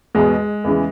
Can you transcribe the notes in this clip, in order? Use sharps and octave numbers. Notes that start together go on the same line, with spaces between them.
E2 B2 G#3
E2 C#3 E3